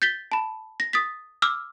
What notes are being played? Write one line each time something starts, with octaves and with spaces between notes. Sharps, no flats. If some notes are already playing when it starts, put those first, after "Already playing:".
G6 A6 B6 G7
A5 B5
A#6
D#6 A6 B6
D6 E6 F6